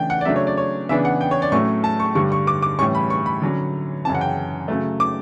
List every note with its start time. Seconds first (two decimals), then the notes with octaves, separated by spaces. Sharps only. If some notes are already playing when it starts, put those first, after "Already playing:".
Already playing: C#3 E3 A3 D4 G5
0.10 F#5
0.21 D5
0.25 C#3 F#3 A3 D4 E5
0.36 C#5
0.47 D5
0.57 C#5
0.89 C#3 E3 B3 D4 E5
1.05 F#5
1.21 G5
1.31 C#5
1.42 D5
1.52 A2 F#3 A3 C#4 C#6
1.84 A5
2.00 C#6
2.15 G2 D3 G3 C#6
2.32 C#6
2.47 D6
2.62 D6
2.79 A2 E3 G3 C#4 C#6
2.95 B5
3.10 C#6
3.26 B5
3.42 D3 F#3 C#4
4.05 F#2 C#3 E3 A5
4.15 F#5
4.21 G5
4.68 C#3 F#3 A3
5.00 D6